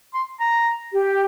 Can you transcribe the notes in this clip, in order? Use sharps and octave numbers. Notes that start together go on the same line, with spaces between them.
C6
A#5
G4